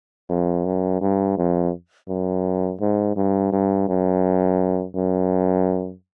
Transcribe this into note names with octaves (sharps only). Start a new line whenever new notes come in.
F2
F#2
G2
F2
F#2
G#2
G2
G2
F#2
F#2